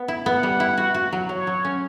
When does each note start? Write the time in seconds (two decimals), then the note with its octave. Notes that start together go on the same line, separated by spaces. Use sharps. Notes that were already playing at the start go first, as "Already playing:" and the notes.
Already playing: B3
0.08 E4
0.26 B3 F#5
0.43 G3
0.60 E4
0.78 F#4
0.94 F#4
1.13 F#3
1.29 F#3 C#5
1.47 F#3
1.65 C#4